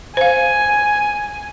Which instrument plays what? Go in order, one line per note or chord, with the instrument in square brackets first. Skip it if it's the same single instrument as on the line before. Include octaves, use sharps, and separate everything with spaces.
[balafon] C5 F5 [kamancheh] G#5